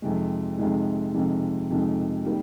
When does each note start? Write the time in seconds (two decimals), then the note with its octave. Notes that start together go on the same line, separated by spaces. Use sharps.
0.02 F2 C3 D#3 G#3
0.58 F2 C3 D#3 G#3
1.14 F2 C3 D#3 G#3
1.70 F2 C3 D#3 G#3
2.26 D#3 G3 A#3